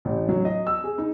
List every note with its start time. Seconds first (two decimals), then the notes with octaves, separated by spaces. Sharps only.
0.05 A1
0.29 F#3
0.45 D#5
0.67 E6
0.84 G#4
0.98 D#4